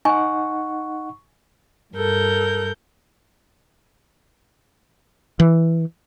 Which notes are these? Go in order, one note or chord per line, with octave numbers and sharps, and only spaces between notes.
D#4 F#5 G#5 C#6
G2 A4 A#4 G6
E3